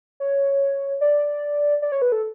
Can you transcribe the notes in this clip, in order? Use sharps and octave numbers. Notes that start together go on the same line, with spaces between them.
C#5
D5
D5
C#5
B4
A4